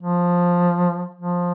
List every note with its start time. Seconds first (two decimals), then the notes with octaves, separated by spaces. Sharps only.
0.03 F3
1.15 F3